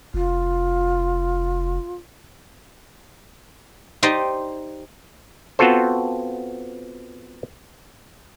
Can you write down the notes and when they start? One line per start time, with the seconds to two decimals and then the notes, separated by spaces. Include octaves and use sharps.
0.14 F1 F4
4.03 D#4 G4 C5 D5 D#5
5.59 B3 C4 F4 F#4 A4 C5